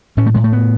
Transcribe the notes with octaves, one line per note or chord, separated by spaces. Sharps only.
A2 C#4
A3
A2 G#3
A3
B3